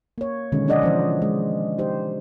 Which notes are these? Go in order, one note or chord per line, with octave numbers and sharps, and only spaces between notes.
A#3 C#5
B2 D3 D#3 G#3 C#4
F3 D4 G#4 D5 D#5 F#5
E3 F3 C#4 C5
G#3
D#4 G4 C5